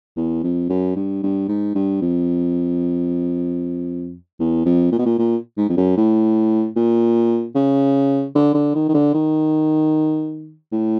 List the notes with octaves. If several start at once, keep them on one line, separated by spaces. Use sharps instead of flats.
E2
F2
F#2
G2
G2
G#2
G2
F2
E2
F2
A#2
B2
A#2
A#2
G#2
F2
F#2
A2
A#2
C#3
D3
D3
D#3
D#3
D3
D#3
A2